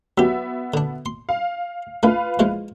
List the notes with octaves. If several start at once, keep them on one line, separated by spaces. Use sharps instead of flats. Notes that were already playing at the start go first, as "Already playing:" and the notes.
F#3 B3 F#4 G4 E5
D3 D4
C6
F5
A3 F4 A4 B4 F5
E3 F3 G#3